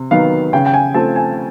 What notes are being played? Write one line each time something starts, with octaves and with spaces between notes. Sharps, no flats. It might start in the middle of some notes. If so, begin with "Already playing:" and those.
Already playing: C3
D#3 F#3 B3 F5
C#3 G5
G5
G#5
F3 A3 C4 A5
G#5